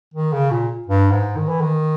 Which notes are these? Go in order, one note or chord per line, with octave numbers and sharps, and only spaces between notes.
D#3
C#3
A#2
G2
G#2
D#3
E3
D#3